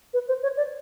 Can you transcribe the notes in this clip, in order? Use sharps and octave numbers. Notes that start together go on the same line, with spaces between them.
B4
C5
C#5
D5